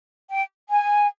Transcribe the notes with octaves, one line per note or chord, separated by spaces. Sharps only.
G5
G#5